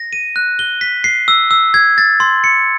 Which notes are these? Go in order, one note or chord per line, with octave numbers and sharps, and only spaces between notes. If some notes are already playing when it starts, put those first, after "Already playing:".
Already playing: A#6
D#7
F#6
G7
B6
C7
E6
E6
G#6
A6
C6
C#7